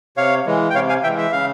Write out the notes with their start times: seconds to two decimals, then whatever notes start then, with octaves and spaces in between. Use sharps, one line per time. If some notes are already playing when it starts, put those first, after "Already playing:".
0.17 C3 C#5 F5
0.46 E3 G#3
0.70 G5
0.75 C3 C#5 F5
0.89 F5 G#5
1.03 E3 G#3 E5 G5
1.18 E5
1.32 C#3 F5